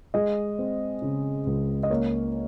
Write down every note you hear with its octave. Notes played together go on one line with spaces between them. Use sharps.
G#3 D#5
C4
C#3
C#2
D#5
A#3 C#5